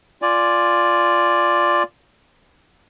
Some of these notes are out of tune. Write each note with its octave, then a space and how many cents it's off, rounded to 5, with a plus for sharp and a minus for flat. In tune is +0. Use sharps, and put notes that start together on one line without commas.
F4 +0 D5 +0 G#5 +0